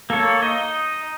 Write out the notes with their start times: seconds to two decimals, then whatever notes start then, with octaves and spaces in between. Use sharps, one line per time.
0.10 A#3 A4 C#5
0.42 D#4 D#5